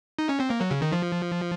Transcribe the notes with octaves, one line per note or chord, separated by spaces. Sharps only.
D#4
C#4
C4
A#3
F#3
C#3
D#3
F3